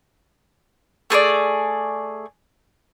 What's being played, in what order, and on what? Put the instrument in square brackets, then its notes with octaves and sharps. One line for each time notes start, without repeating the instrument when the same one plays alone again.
[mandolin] A3 G#4 A#4 D5